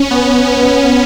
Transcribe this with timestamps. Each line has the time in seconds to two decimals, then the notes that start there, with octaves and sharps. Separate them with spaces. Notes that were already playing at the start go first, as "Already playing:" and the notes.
Already playing: C#4
0.11 B3